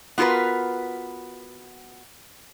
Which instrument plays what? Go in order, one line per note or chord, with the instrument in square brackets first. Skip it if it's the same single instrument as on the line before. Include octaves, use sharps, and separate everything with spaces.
[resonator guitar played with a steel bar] B3 F4 F#4 A#4 B4